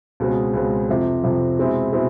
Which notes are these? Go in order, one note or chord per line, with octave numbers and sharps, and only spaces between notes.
C#2 B2 G#3 C4
C#2 B2 G#3 C4
F2 C3 F3
F2 C3 F3
B2 G#3 C4 E4
B2 G#3 C4 E4